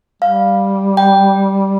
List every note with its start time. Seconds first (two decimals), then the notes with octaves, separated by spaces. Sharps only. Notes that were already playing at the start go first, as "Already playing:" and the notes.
0.22 G3 F5
0.97 G5